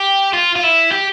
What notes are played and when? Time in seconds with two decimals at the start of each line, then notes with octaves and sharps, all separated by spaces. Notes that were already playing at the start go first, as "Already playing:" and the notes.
Already playing: G4
0.33 F4
0.56 F4
0.63 E4
0.92 G4